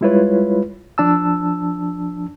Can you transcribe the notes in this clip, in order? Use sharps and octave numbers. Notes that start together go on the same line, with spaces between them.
G3 G#3 E4 F4 B4 C#5
F3 D4 A5 E6